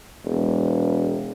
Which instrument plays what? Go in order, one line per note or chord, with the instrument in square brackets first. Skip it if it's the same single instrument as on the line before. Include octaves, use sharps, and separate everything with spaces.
[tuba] E1